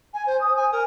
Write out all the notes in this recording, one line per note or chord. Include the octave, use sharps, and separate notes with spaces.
G#5
C5
D#6
G#5
A#4